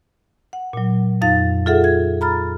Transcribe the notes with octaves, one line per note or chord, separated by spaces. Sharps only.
F#5
A#2 F#3
F2 D#4 F5 A6
F4 G#4 A4 E5 F#5
G#6
A#5 B5 F6 A6